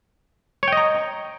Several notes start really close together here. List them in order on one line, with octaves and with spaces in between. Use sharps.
C#5 G5 D#5 A#5